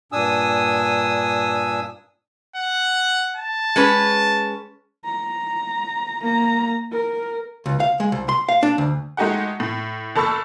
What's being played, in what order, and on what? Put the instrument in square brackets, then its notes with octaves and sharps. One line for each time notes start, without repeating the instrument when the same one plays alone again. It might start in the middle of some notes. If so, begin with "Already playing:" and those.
[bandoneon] G2 A#2 D4 G#5 D#6 E6
[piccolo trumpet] F#5
A5
[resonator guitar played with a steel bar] G#3 C#4 B4
[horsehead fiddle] A#5
A#3 A#5
A#4
[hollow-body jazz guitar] C#2
F5
G#3
C2
C6
F5
D4
D2
[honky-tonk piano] G#3 A3 D#4 F#4 G4 F#5
A2
F#1 A4 B5 C#6 E6